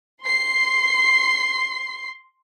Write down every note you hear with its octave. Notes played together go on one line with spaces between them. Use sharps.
C6 C7